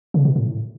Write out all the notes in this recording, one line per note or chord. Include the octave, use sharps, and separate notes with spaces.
C#3
B2
A2